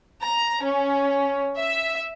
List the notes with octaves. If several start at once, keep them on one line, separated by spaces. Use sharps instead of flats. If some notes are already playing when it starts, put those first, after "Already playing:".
A#5
C#4
E5